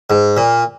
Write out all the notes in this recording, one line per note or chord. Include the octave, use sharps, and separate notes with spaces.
G#2
A#2